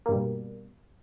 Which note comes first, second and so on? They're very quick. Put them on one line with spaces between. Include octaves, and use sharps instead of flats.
A#3 G2 G3 B2